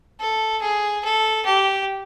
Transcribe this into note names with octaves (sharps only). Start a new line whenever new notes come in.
A4
G#4
A4
G4